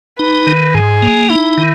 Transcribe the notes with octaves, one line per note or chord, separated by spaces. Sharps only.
D#4 B4
D#3
G#2 G#4
A#3
D#4 E4
D#3